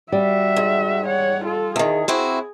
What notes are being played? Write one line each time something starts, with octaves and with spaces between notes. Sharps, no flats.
G3 F#4 E5
G#2
C#5 F#5
F4 A4
E2 D#3 G#4
C4 E4 F#4